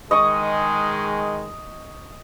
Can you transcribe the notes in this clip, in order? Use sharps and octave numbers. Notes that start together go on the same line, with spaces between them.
D#3 G#3 D#5 C#6 D#6